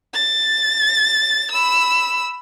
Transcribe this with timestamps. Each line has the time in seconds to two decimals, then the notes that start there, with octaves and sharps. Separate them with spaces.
0.13 A6
1.52 B5 E6